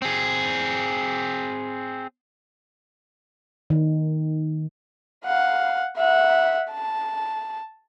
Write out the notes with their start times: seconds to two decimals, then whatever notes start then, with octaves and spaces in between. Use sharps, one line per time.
0.02 C4 G#4
3.70 D#3
5.25 F5 F#5
5.97 E5 F#5
6.71 A5